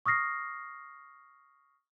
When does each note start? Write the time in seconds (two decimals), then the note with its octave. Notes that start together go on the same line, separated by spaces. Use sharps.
0.06 C#6 D#6 F6 A#6 C7